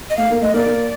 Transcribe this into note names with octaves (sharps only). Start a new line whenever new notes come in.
D#5
A3 F5
A#3
A3 D#5
A#3 D5
A#3